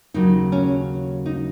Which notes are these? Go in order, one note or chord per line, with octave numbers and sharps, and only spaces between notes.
D#2 C#3 F#3 D#4
C#4
D#4